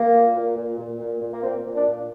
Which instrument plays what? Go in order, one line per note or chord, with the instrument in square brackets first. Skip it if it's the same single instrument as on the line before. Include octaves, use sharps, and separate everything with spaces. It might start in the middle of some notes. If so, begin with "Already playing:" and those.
Already playing: [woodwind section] A#3
A#2
A#2
A#2
A#2
A#2
A#2
A#3
A#2 C4
A#2
D4
A#2